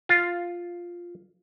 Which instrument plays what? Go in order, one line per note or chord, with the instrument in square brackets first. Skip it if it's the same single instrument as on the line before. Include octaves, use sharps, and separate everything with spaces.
[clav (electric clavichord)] F4